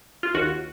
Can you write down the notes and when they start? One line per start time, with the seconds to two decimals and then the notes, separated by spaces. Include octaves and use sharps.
0.23 F4
0.34 D#2 F#4